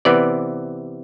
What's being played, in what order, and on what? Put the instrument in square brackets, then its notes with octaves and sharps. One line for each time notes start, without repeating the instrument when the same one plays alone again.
[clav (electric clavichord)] C3 E3 B3 D5